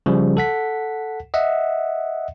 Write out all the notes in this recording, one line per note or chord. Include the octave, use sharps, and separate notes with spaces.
C#3 F3 G3
A4 F#5 B6
D#5 E5 F#5